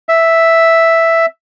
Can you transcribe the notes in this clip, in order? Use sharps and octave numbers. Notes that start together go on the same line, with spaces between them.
E5